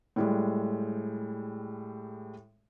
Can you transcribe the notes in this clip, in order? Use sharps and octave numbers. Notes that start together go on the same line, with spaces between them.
A2 G3 G#3